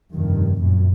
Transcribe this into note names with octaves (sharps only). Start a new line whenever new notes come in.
F1 G2 D#3
F#2 A#2